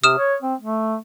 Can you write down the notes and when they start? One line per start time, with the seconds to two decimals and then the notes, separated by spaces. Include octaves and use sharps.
0.04 C3 D#6 F6 E7
0.18 C#5
0.42 C4
0.61 A3